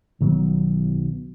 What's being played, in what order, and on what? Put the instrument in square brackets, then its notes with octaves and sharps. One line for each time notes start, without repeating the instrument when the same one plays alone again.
[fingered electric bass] B1 D#3 F#3 B3